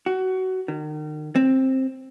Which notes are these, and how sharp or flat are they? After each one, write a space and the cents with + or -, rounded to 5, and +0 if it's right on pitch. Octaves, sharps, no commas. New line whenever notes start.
F#4 +20
D#3 -35
C4 +10